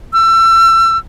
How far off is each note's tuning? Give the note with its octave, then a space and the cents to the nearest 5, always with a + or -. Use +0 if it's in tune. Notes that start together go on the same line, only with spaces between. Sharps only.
E6 +30